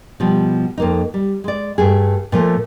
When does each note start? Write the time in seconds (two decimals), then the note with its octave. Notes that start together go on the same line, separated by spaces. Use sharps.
0.20 B2 F3 G3
0.78 F2 A#3 D#4
1.14 G3
1.44 G#3 D5
1.78 G2 A3 G#4
2.32 A#2 F3 A3 A#3